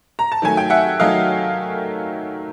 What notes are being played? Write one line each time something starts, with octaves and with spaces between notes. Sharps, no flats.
A#5
A5
D#3 F#3 A3 G#5
G5
E5 F#5
D#3 F#3 A3 D#5 F5